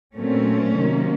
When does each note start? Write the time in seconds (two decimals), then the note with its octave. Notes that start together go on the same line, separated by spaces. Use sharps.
0.16 A#2 F#3 A3 C4 C#4
0.77 C3 D#3 F#3 A#3